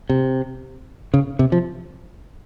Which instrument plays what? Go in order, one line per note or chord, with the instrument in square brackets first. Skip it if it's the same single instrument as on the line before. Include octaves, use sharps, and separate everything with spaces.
[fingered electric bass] C3
C#3
C3
F3